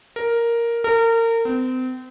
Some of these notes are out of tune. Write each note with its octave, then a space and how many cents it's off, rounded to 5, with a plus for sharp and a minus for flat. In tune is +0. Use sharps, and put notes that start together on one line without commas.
A#4 +0
A#4 -30
C4 -35